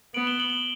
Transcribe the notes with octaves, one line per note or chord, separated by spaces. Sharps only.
B3 D7 F#7
E7 G7
F#7
G7